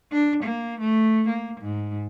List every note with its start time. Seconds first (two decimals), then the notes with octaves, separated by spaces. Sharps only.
0.12 D4
0.43 A#3
0.80 A3
1.28 A#3
1.61 G#2